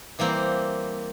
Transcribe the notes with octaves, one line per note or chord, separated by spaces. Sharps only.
E3 G3 A#3 C4